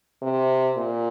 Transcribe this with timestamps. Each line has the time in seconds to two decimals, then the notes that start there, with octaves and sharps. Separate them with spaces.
0.22 C3
0.76 A#2